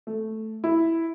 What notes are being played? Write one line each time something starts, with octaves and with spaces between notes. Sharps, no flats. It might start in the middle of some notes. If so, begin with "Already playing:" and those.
A3
E4